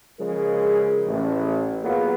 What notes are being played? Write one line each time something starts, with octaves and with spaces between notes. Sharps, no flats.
C#3 F3 G#3 G#4 A#4
A1
F#3 A#3 B3 F4 G#4 B4